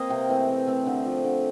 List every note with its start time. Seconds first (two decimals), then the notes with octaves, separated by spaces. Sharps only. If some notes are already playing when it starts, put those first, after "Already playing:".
Already playing: A#3 C4 C5 D#5 F5
0.10 C3 G5
0.29 E3 A3 C4
0.48 E3
0.67 A3 C4
0.86 D3
1.05 F3 A3
1.24 D3